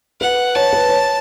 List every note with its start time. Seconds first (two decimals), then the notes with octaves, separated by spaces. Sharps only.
0.21 B4 F#5
0.56 C#5 A5
0.73 B4
0.90 C#5